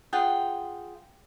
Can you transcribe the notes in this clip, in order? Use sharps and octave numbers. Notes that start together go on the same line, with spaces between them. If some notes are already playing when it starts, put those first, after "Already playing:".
F4 G#4 F#5 G5